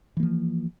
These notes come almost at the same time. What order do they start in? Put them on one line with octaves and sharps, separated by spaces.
E3 A#3 F3